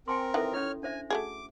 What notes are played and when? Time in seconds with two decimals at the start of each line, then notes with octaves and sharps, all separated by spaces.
0.08 C4 A#4 G5 G#5 C6
0.34 D#3 E3 A4 E5 F#5
0.53 C#4 E4 C#5 F6
0.83 D4 C5 E5 G#5
1.10 A3 F#4 G#4 D6